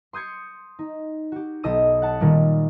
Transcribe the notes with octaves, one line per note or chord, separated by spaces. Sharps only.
C6 D#6 G6 G#6 C#7
D#4
F#4 G4
B1 A4 D#5 D#6 D#7
F#5 A5
A#2 D#3 G3